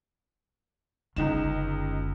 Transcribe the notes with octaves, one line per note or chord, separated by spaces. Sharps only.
F#1 C#2 D3 D#4 E7